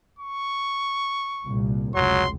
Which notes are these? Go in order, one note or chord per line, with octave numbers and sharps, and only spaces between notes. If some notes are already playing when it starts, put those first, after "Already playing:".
C#6
C2 A#2
F1 C#2 F#3 C6